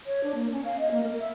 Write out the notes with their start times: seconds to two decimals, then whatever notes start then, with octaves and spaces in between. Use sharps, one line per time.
0.06 C#5
0.23 D4
0.35 A#3
0.52 C#4
0.65 F5
0.79 D#5
0.91 A#3
1.03 A#4
1.19 E5